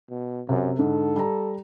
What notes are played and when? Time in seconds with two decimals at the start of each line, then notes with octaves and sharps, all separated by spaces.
0.10 B2
0.49 F#2 C3
0.79 G#2 D3 A4
1.16 G3 A#5